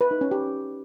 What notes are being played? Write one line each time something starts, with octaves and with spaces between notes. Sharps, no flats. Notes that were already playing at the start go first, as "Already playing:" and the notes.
B4
D#4
C#4
G4